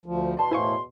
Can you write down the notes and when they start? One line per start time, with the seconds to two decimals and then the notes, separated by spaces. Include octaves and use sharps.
0.06 D2 F3
0.37 E2 B2 D5 A5 C6
0.51 A2 E4 C5 F5 G#5 C#6